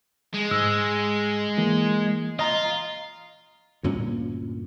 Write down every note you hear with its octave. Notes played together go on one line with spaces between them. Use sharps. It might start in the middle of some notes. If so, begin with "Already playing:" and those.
G#3
G#2 E6
E3 A#3
F4 D#5 A#5
D2 G2 A#2 C#4